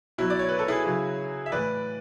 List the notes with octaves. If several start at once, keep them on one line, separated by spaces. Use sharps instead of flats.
B2 F#3 E4
D5
C#5
B4
A4
E4 G#4
C#3 F#3
E5
A2 E3 B4 D5